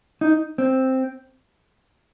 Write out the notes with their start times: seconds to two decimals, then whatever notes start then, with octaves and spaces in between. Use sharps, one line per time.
0.21 D#4
0.58 C4